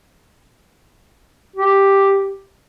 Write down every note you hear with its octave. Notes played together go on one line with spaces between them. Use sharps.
G4